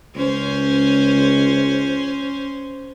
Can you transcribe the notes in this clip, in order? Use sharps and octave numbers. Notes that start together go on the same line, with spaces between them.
C#2 C#4 C5